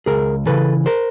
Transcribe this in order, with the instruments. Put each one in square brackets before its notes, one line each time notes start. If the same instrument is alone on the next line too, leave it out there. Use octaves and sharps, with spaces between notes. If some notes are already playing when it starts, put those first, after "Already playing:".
[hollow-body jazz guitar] C#2 G#4 A#4
C#3 E3 A4 B4
A#4 C5